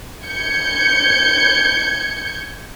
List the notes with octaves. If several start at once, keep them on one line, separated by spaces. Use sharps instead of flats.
G6 G#6 C#7